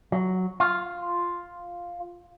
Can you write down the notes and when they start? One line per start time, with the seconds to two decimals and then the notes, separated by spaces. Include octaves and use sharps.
0.12 F#3
0.60 F4